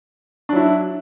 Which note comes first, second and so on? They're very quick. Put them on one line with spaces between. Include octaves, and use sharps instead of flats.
D4 F#3 E4